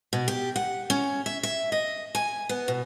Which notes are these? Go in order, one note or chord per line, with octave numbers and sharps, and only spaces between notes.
B2
G4
F#5
C#4
E5
E5
D#5
G#5
B3
B2